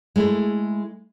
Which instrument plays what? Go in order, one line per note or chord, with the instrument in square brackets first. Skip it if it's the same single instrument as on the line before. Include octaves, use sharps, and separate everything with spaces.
[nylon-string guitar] G#3 A3 E4